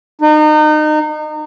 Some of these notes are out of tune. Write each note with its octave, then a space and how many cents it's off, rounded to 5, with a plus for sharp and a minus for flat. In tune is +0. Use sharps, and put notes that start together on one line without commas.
D#4 -30